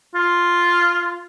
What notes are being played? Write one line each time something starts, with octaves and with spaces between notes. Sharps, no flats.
F4